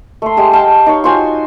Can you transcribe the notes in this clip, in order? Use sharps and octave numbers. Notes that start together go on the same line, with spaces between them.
A3 C6
G#3 G4 G#4
F5 G5 A5
D#4 C#5
F4 F#4 C5 G#5